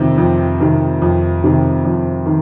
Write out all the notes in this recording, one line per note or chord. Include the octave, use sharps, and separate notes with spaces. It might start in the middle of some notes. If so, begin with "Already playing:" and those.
Already playing: F2 C3 D#3
F2
C3 D#3
F2
C3 D#3
F2
D#3